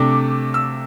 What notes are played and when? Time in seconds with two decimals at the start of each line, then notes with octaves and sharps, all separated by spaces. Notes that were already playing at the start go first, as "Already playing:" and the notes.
Already playing: C3 A3 D4 D6
0.54 E6